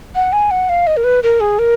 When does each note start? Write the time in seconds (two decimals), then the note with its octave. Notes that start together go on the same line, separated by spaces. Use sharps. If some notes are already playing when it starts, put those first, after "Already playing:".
0.15 F#5
0.32 G#5
0.51 F#5
0.69 F5
0.87 D#5
0.97 A#4
1.04 B4
1.23 A#4
1.40 G#4
1.59 A#4